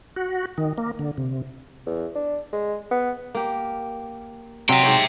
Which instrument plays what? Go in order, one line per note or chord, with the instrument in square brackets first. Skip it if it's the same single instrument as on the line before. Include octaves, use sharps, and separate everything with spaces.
[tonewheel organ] F#4
D#3
A#3
D3
C3
[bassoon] E2
D4
G#3
B3
[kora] A#3 G4
[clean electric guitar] C3 [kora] F#3 C4 D#4 [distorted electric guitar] E5 G5
[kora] G#2 G4 C#5